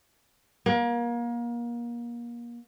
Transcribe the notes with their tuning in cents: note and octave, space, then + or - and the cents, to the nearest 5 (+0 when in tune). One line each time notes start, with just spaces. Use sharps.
A#3 +30